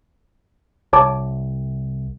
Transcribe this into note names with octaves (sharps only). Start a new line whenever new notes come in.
C2 C#5 A5 D6